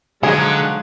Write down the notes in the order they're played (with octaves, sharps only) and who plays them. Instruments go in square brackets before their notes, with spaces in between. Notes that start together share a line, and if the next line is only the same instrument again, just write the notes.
[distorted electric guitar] D3 [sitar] F3 F#3 D#4 [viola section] G#3 [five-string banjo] G#4